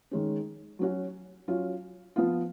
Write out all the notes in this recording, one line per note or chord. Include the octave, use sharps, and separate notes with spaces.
D#3 G#3 C#4
F#3 C#4 F#4
F#3 C#4 F4
F3 B3 F4